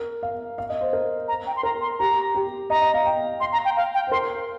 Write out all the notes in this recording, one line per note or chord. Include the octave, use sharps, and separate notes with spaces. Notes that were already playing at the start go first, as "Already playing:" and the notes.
Already playing: A#4
F5
F5
D#5
C5
A#4
A#5
G5
C6
A#4 A#5
C6
G4 A#5
G4
D#5 A#5
D#5
F5
G5
F5 C6
A#5
G5
F5
G5
C5
A#4 C6